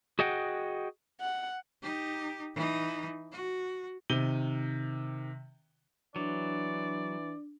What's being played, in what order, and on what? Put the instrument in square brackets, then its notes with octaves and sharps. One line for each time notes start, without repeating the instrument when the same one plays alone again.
[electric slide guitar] F#4 G#4 D#5 F#5 G5
[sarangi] F#5
[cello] D#4 G4
E3 D#4
F#4
[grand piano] C3 D#3 D#7 G7
[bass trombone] E3 [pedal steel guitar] F#3 [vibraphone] D4 [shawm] D5